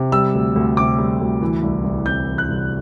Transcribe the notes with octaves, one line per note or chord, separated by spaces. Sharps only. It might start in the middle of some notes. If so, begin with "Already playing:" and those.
Already playing: C3
G3 E6
D2
D2
C3 D6
G3
D2
E3
C2
C2
C3 G6
E3
F#6
C2